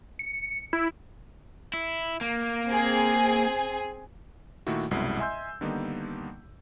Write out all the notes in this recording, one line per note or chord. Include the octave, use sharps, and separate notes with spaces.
C#7
E4
E4
A#3
C4 G#4 G#5
A#2 D#3 A3 E4 F#4
C2 F#2 B2 G#3 E4 C7
D#5 E5 G#5 C6 E6 G6
D3 D#3 G3 A#3 B3 D#4